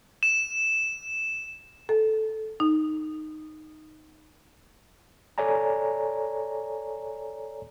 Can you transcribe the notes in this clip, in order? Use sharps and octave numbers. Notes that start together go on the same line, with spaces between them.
E7
A4
D#4
A4 C#5 D5 G#5 A#5